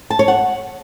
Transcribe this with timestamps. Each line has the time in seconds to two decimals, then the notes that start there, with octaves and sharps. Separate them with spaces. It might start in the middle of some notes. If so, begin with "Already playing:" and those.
0.10 A5
0.19 C#5
0.28 F#5